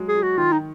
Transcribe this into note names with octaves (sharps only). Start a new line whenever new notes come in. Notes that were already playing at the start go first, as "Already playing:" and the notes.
Already playing: F#3 G#3
G#4
F#3
F#4
D#3 F4
D#4